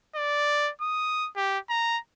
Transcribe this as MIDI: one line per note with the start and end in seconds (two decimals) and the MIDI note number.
0.15 0.71 74
0.81 1.29 87
1.36 1.58 67
1.69 1.98 82